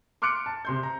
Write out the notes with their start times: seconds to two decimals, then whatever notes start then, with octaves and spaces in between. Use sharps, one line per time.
0.22 C6 D6 F6 F#6 C#7 D7
0.46 A5
0.65 C3 C6 G6
0.83 A#5